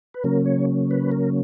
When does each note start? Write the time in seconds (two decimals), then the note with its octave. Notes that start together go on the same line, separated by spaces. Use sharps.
0.14 B4
0.24 C#3 F#3 A#3 C#4 A#4
0.45 C#5
0.91 B4
1.12 A#4